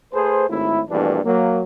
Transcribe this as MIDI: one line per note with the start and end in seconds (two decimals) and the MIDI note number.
0.13 0.48 57
0.13 0.48 68
0.13 0.48 69
0.13 0.48 71
0.13 0.48 72
0.49 0.81 32
0.49 0.81 45
0.49 0.81 64
0.89 1.20 34
0.89 1.20 43
0.89 1.20 47
0.89 1.20 52
0.89 1.20 57
0.89 1.20 62
1.25 1.61 54
1.25 1.61 58